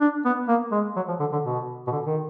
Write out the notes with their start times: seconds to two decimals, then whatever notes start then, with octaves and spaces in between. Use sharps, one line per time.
0.01 D4
0.25 B3
0.49 A#3
0.72 G#3
0.96 F#3
1.08 F3
1.20 D3
1.33 D3
1.44 B2
1.87 B2
1.92 D3
2.06 D#3